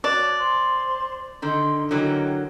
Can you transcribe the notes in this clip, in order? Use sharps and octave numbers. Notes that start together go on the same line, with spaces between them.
F#4 C#5 D5 A5 F#6
C5 C6
D3 D#3 D#4 C6
D3 E3 F#3 D#4 A#4 G5